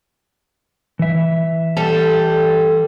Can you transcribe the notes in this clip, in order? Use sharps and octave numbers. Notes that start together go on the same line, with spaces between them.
E3 E5
G3 A4